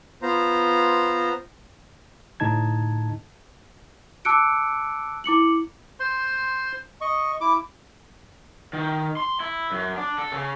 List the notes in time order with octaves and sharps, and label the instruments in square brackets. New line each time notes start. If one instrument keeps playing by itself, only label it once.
[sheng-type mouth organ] B3 F4 C5 A#5
[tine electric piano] A2 D3 D#4 A5 G#6
[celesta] A5 D6 E6 F#6 C#7 D7
E4 D6 C#7 F#7
[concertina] C5 C6
D#5 C#6
E4 D6
[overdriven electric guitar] D#3
C6
E4
F#2
D4
A4
C#3